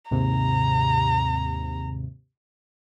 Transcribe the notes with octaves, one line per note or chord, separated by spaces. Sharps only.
D#2 G#2 C3 A#5